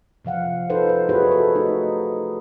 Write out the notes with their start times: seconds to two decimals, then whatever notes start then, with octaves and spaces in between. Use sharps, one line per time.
0.25 C3 F3 F5 F#5
0.70 D#4 F4 A4 B4 C5
0.89 C5
1.09 D#4 E4 F#4 G#4 B4 C#5
1.31 F#4 A4
1.55 A3 D#4